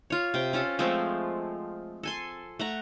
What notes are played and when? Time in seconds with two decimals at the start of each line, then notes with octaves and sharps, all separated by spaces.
0.10 F4 C#5
0.34 C3 G5
0.53 C#4 F4 A4
0.79 F3 G#3 A3 C4
2.03 A4 G#5 C6
2.59 A3 F#5 A#5